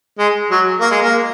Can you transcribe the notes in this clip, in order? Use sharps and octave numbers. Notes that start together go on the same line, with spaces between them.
G#3
F#3
A#3
G#3
A#3